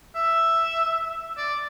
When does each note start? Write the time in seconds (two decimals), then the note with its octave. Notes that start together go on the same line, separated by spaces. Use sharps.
0.15 E5
1.37 D5